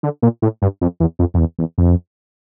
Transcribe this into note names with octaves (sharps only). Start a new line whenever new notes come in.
D3
A#2
A2
G2
F2
E2
F2
F2
E2
E2
F2